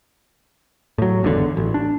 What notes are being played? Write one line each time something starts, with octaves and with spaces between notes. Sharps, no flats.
A2 F#3
G#1 E2 G2 D3
A1
D4